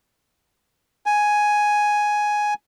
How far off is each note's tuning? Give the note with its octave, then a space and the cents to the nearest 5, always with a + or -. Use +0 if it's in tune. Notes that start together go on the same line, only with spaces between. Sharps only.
G#5 +5